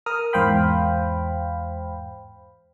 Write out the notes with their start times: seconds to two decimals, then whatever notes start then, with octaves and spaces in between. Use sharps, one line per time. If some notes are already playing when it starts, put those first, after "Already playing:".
0.06 A#4 D#6 F6
0.33 E2 G#2 C5 F5 G5 B5